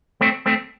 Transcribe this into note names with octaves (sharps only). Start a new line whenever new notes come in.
A3 C4
A3 C4